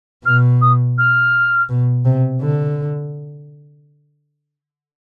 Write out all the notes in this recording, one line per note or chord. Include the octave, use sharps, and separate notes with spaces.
B2 F6
D#6
F6
B2
C3
D3